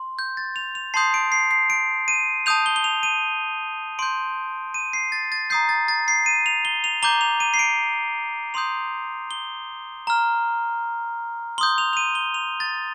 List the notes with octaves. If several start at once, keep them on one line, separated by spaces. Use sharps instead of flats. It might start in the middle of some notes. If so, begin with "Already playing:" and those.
Already playing: C6
G6
A6
F7
F7
A5 C6 D#6 G6 C7
D7
C7
C7
D7
D#7
A5 D#6 G6 F7
G7
G7
F7
D#7
C6 G6 D7
D#7
C7
A6
A6
A#5 D#6 G6 C7
A6
A6
C7
D#7
F7
G7
F7
A#5 D6 G6 G7
F7
D#7
C7
D7
C6 D#6 G6 F7
G7
A#5 F6
C6 D#6 G6 G7
F7
F7
D#7
G7
F7
A6